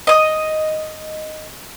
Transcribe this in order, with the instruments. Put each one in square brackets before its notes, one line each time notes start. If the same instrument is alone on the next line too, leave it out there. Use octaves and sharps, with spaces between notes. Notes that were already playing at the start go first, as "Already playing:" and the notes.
[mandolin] D#5 D#6